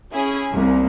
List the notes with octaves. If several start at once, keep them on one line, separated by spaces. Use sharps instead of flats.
C#4 E4 G#4
C2 A#3